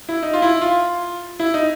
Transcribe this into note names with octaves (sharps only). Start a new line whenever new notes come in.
E4
D#4
F4
E4
F4
E4
D#4